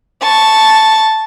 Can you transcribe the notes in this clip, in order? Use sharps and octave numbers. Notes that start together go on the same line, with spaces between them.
A5 C#6